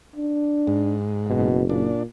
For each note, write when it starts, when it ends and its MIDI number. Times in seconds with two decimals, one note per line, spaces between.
0.16 0.95 62
0.67 1.49 44
1.29 1.91 30
1.29 1.63 47
1.70 2.03 46
1.70 2.03 62